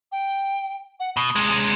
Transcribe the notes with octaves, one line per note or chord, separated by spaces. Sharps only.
G5
F#5
B2 D#6
C3 G#3